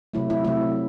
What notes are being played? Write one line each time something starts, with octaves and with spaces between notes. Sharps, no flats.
C3 F#3 A3 E4
E4
C3 F#3 A3 E4